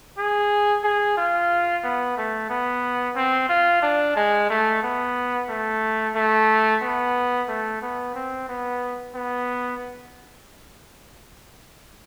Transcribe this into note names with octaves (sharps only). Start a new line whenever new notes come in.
G#4
G#4
F4
B3
A3
B3
C4
F4
D4
G#3
A3
B3
A3
A3
B3
A3
B3
C4
B3
B3